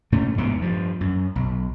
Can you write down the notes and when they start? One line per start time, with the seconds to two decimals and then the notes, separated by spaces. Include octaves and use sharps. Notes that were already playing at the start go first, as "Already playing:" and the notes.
0.12 A2 A3 C#4
0.38 E2 G#2 C3 B3
0.62 G2 F3
1.01 F#2
1.35 B1